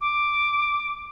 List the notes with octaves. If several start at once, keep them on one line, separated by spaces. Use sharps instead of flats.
D6